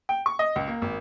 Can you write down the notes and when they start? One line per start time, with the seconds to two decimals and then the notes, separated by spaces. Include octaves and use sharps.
0.09 G5
0.26 C#6
0.39 D#5
0.56 C#2
0.68 A#3
0.82 G#1